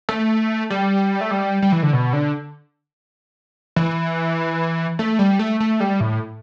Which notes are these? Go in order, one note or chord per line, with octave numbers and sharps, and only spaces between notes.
A3
G3
A3
G3
G3
E3
D3
B2
D3
E3
A3
G3
A3
A3
G3
A2